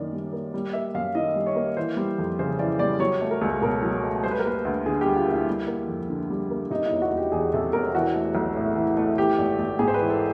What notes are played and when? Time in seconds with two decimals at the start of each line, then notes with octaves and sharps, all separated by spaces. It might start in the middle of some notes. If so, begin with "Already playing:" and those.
Already playing: F#2 D#3 A#3 D5
0.13 G3
0.33 A#3
0.54 G3
0.73 A#3 E5
0.94 F#2 F5
1.15 D#3 D#5
1.36 G3
1.46 C#5
1.56 A#3
1.77 E3 C5
1.97 G3
2.18 F2
2.39 C#3 C5
2.59 E3 D5
2.79 G3 D5
3.00 F#3 C#5
3.21 A3
3.31 A#4
3.42 C#2
3.61 B2 A#4
3.82 F#3
4.03 A3
4.24 G3 C5
4.31 B4
4.39 A#4
4.45 A#3 B4
4.65 D2
4.86 D3 G#4
5.01 G3 G4
5.16 F4
5.27 A#3 E4
5.47 G3
5.67 A#3
5.88 F2
6.09 D3
6.30 G3
6.50 A#3
6.70 C3 D#4
6.86 E4
6.91 E1
7.02 F#4
7.11 E1
7.17 G4
7.32 E2 G#4
7.53 C3 A4
7.73 E1 A#4
7.95 E3 F#4
8.15 A3
8.35 B1
8.56 A2
8.76 E3
8.97 A3
9.17 E3 G4
9.39 G#1
9.59 G#1
9.79 G#2 G#4
9.88 C5
9.94 B4
9.99 E3
10.10 A4